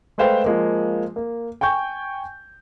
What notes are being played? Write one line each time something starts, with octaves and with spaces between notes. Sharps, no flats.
G#3 A3 B4 C5 F5 G5
F3 G#3 A#3
A#3
G5 G#5 C#6 G6